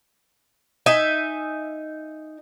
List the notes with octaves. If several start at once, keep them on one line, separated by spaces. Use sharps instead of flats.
D#4 E5 G#5